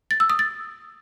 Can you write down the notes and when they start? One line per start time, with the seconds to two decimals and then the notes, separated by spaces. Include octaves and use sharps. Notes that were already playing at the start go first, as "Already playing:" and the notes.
0.11 A6
0.20 E6
0.30 D#6
0.39 A6